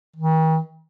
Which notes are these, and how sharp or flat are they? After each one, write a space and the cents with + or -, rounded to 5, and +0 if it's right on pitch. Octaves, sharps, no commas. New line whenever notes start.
D#3 +45